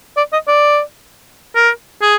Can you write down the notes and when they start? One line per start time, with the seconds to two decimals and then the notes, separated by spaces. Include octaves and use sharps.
0.17 D5
0.33 D#5
0.48 D5
1.56 A#4
2.02 G#4